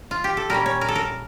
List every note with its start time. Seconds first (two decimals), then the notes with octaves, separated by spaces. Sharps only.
0.11 F4
0.24 G4
0.37 A4
0.50 A#2 G3 A#3 C#4 A#4
0.66 C#5
0.81 A#4
0.88 A4
0.95 A#4